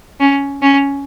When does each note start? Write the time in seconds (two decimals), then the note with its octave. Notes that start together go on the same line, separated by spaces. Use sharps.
0.20 C#4
0.62 C#4